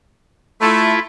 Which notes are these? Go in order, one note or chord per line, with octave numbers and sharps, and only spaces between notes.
A3 E4 F4 E5